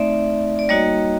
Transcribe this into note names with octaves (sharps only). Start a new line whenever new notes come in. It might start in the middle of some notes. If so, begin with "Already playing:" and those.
Already playing: A3 C4 D#4 D5 E5
D5
G3 A#3 D#4 F#4 C#5 D#5